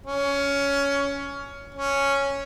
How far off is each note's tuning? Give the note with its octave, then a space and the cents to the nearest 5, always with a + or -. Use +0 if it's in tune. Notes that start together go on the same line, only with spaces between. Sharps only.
C#4 +15
C#4 +0